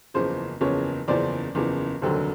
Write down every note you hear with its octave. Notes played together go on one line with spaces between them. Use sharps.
F#1 E2 C#3 F3 C5
F#1 E2 C#3 F3 C#5
F#1 E2 C#3 F3 C5 D5
F#1 E2 C#3 F3
F1 D#2 D3 F#3 C5